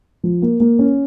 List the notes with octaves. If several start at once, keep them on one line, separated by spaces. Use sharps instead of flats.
F3
A#3
A#3
C#4